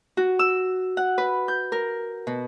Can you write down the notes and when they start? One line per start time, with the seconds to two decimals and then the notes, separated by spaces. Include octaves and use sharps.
0.17 F#4
0.39 E6
0.97 F#5
1.18 B4
1.48 G6
1.72 A#4
2.27 B2